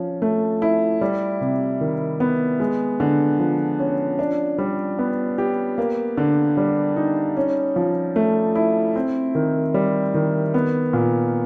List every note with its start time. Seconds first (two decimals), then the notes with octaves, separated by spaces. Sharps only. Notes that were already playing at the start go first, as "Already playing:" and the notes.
Already playing: F3 C#4
0.22 A3
0.62 E4
1.01 G3
1.41 C3
1.81 D#3
2.20 B3
2.60 G#3
3.00 D3
3.39 F3
3.79 C#4
4.19 D4
4.58 G3
4.99 B3
5.38 G4
5.78 A#3
6.17 D3
6.57 G3
6.96 D#4
7.37 C#4
7.76 F3
8.16 A3
8.55 E4
8.96 C4
9.35 D#3
9.74 G3
10.14 D#3
10.54 B3
10.93 A#2